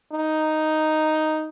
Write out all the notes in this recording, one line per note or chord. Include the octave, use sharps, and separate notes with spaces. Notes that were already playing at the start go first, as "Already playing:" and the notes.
D#4